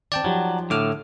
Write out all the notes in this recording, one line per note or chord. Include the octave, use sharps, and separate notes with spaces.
D#3 C4 D5 G5 A5
F3 F#3 D#4 G4
A2 D3 D6 F6